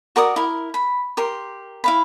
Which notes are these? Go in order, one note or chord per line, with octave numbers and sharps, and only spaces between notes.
F#4 A#4 D5 D#6
E4 A#4
B5
G4 A#4 C6
E4 F5 B5